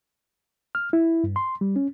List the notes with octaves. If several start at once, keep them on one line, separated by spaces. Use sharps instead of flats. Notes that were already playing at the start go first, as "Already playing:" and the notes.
F6
E4
G2
C6
G3
C#4